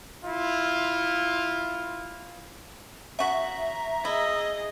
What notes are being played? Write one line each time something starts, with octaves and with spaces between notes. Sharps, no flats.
E4 F4
C#3 F#4 E5 A#5
E4 G#4 D#5